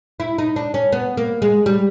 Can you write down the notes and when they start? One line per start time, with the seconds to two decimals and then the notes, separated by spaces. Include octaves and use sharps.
0.20 E4
0.38 D#4
0.56 D4
0.74 C#4
0.92 B3
1.17 A#3
1.42 G#3
1.66 G3